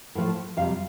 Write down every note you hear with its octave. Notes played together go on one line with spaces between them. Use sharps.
A2 F3 A3
F2 C3 G3 F5